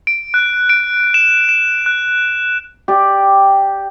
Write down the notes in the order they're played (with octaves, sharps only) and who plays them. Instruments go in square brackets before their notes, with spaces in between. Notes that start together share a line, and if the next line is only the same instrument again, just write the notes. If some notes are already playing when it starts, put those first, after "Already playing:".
[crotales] D7
F#6
D7
E7
E7
F#6
[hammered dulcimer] G4 D5